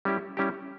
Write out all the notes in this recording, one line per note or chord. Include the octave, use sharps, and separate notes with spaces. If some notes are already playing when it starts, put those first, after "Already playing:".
G3 C#4 E4 G4
G3 C#4 E4 G4